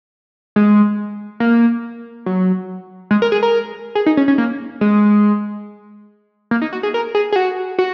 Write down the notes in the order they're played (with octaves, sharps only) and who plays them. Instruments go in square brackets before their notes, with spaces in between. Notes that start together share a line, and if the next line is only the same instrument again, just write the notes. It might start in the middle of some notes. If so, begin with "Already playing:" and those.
[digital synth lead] G#3
A#3
F#3
G#3
A#4
G#4
A#4
G#4
D#4
C#4
C#4
A#3
G#3
A#3
D#4
F#4
G#4
A#4
G#4
G#4
F#4
F#4